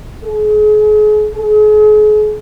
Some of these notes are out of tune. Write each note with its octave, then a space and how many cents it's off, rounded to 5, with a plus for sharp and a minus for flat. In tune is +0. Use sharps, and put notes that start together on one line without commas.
G#4 +35
G#4 +40